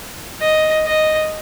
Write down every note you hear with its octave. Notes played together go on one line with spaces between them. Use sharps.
D#5
D#5